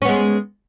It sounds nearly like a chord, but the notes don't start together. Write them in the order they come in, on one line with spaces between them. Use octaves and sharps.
C#4 B3 G#3